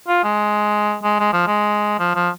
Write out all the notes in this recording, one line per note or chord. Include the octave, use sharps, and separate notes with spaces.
F4
G#3
G#3
G#3
F3
G#3
F3
F3